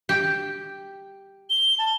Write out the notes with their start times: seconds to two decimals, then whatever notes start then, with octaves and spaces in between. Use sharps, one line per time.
0.09 G4
1.50 G7
1.79 A5